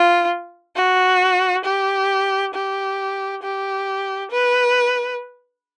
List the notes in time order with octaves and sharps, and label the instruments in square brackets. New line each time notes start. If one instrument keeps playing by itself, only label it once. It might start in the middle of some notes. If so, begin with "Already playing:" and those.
Already playing: [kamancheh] F4
F#4
G4
G4
G4
B4